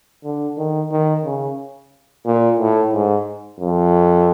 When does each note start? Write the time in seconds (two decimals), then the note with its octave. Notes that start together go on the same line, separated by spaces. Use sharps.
0.24 D3
0.58 D#3
0.91 D#3
1.25 C#3
2.26 A#2
2.60 A2
2.93 G#2
3.60 F2